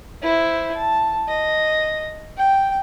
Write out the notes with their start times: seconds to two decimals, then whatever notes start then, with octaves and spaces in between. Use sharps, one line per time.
0.22 E4 C5
0.75 A5
1.28 D#5
2.38 G5